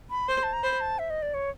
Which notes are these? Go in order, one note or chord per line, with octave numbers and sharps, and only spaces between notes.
B5
C5 C6
A5
A#5
C5 B5
A5
E5
D#5
D5
C#5